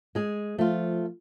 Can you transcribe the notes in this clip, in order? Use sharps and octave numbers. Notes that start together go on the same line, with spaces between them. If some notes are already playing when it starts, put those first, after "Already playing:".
G#3 G#4
F3 A3 F4